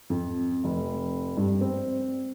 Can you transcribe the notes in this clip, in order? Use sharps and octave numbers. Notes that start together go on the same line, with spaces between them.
F2
F1
G2
C4